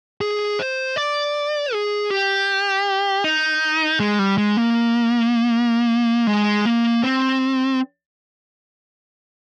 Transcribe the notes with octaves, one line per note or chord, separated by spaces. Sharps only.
G#4
C5
D5
G#4
G4
D#4
G#3
G3
G#3
A#3
G#3
A#3
C4